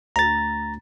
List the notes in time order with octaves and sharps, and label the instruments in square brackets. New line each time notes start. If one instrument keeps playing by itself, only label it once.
[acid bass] D2 [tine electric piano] A#5 A6